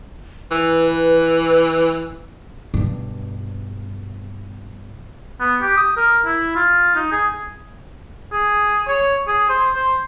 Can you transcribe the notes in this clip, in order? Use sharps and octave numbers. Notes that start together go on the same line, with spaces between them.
E3 B4
G2 B2
B3
G4
D#6
A#4
E4
F4
D#4
G#4
G#4
C#5
G#4
C5
C5